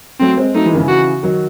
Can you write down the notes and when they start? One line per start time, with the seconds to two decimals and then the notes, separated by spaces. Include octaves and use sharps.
0.20 F#3 A3 C4
0.37 G#3 C4
0.54 F#3 A3 D#4
0.66 E3 G#3
0.74 D#3
0.77 C#3 E3
0.88 F#4
1.23 D#3 F#3